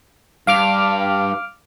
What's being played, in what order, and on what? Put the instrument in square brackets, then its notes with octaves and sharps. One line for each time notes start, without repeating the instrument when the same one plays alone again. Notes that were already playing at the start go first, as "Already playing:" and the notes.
[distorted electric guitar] G2 [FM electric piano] F5 D6 F6